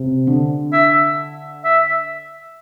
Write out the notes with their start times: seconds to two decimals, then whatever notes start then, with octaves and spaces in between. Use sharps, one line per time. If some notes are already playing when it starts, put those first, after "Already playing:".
Already playing: C3
0.27 D3
0.73 E5
1.64 E5